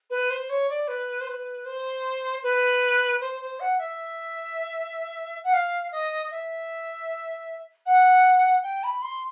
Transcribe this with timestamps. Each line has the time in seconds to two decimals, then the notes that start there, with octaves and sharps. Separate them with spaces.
0.10 B4
0.30 C5
0.49 C#5
0.69 D5
0.87 B4
1.21 C5
1.27 B4
1.65 C5
2.42 B4
3.21 C5
3.41 C5
3.60 F#5
3.78 E5
5.44 F#5
5.53 F5
5.92 D#5
6.31 E5
7.86 F#5
8.63 G5
8.83 B5
9.02 C6